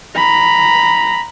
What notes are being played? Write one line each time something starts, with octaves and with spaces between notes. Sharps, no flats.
A#5 B5